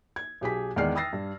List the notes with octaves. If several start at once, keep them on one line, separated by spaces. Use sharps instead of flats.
G#6
B1 G4 G#4 B6
E2 D#3 G#3 D5 F6 C7
G5 D#6 E6 A6 A#6 C7
G2